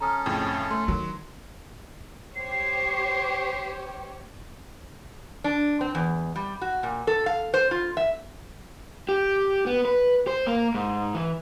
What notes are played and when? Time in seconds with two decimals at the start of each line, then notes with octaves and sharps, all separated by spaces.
0.01 C#4 A4 A#5 D#6 F6
0.26 F2 A2 C#3 G5
0.71 A3 C6
0.88 D#3 F#3
2.35 G4 C5 C#5 C7
5.44 D4
5.81 C4
5.95 E2
6.36 G3
6.62 F#4
6.83 A#2
7.07 A4
7.26 F5
7.54 C5
7.71 F4
7.97 E5
9.09 G4
9.66 B3
9.85 B4
10.27 C5
10.47 A#3
10.74 G#2
11.15 E3